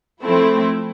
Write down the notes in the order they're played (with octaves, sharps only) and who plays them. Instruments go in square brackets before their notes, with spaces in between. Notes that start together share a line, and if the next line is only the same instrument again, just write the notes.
[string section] F3 A3 C4 E4